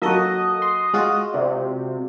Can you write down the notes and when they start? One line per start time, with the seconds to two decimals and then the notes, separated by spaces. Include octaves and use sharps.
0.02 F#3 A#3 F#4 A4 D#5
0.62 C6
0.94 G#3 F4 F#4
1.34 C3 D5